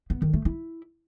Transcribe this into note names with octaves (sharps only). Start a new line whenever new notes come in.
B3
D#3
A3
E4